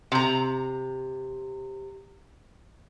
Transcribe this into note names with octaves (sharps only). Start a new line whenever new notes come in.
C3 A#5